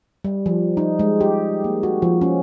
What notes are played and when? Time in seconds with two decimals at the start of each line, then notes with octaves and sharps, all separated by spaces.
0.24 G3
0.46 F3
0.77 D#4
0.99 G#3
1.21 G4
1.64 A#3
1.83 F#4
2.02 F3
2.21 C#4